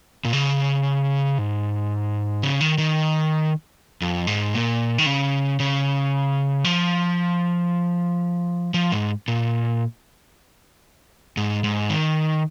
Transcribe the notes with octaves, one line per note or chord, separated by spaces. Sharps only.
A#2
C#3
G#2
C#3
D#3
D#3
F2
G#2
A#2
D#3
C#3
C#3
F3
F3
G#2
A#2
G#2
G#2
D#3